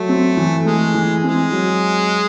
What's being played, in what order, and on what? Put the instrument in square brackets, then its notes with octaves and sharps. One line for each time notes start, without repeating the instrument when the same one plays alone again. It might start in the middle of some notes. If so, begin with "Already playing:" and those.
Already playing: [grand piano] F#3 [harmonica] A3
[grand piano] C4
E3
[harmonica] G#3 [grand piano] A3
[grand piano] E3
[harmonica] G#3 [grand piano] C4
[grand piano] F#3